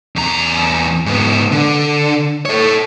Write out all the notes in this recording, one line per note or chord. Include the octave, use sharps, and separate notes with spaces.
E2 A#5
G#2 B3
D3
A4 C#5